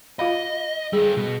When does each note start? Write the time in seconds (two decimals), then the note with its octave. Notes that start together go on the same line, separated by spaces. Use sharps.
0.19 F4 D#5 F5 B5
0.93 G3 G#4 A4
1.17 B2